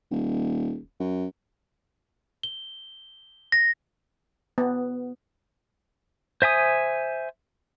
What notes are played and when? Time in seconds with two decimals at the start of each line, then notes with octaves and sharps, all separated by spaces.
0.11 D#1
1.00 F#2
2.43 G7
3.52 A#6
4.58 B3
6.42 C5 E5 G#5 D#6